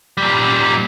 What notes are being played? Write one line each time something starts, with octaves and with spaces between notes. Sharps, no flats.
A#2 G3